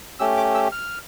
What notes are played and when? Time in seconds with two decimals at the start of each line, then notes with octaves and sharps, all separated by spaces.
0.19 A3 C#4 G4 E6
0.37 D6
0.55 E6
0.72 F6